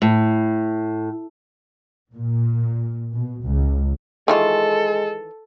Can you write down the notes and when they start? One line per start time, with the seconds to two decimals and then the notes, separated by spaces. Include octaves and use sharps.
0.02 A2
2.13 A#2
3.13 B2
3.43 C#2
4.28 D#3 E3 G#3 F4 A4